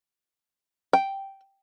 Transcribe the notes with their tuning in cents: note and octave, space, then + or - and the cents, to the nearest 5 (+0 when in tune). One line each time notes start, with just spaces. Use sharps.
G5 -5